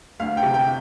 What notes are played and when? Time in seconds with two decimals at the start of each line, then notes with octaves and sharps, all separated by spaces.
0.20 D2 F5
0.37 G5
0.42 C3
0.54 G5